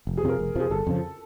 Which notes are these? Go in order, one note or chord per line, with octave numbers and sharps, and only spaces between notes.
F1
G#4
F2 C3 F3 A#4
F1
F2 C3 F3 G#4
G1 A4
F2 C#3 F3